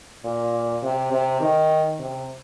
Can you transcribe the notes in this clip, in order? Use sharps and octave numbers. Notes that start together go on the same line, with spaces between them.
A#2
C3
C3
D#3
C3